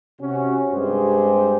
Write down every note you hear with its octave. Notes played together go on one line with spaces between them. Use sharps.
C3 C#4 F#4
G2 G#3 C4 G4 G#4 C5